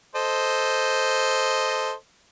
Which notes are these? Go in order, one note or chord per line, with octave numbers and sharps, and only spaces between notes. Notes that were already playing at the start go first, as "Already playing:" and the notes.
A4 C5 D#5